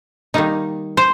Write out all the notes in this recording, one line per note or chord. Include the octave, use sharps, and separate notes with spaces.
D#3 G3 A#3 D#4
C5